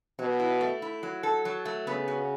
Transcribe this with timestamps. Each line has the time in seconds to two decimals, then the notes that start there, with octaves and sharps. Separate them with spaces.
0.19 B2 F#3
0.40 E4
0.61 A3
0.82 E4
1.03 F#3
1.23 A4
1.45 F#3
1.65 A3
1.87 C#3 B3
2.08 F#4